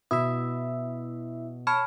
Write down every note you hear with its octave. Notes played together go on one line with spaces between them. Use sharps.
B2 E4 E5 D#6
C#5 A5 B5 F6